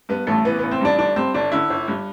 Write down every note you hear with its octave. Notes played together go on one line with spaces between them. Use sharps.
G2 B3
A1 A3
E3 B3
B3
A1
C4
G2 D4
G1 D4
G2 C4
G1 D4
D3 E4
G1
G2